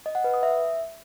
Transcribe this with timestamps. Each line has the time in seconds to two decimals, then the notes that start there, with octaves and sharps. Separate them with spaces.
0.06 D#5
0.15 F#5
0.24 B4
0.34 D#6
0.43 E5